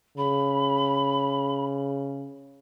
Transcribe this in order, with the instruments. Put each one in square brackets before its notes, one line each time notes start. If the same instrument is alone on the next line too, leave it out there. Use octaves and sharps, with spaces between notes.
[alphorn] C#3 [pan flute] B5